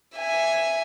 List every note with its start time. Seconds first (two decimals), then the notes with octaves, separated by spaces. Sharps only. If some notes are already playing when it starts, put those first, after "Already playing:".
0.17 E5 G#5